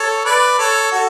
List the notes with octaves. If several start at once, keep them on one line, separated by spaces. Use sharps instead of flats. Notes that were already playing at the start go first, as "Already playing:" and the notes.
Already playing: A4 C#5
B4 D5
A4 C#5
F#4 A4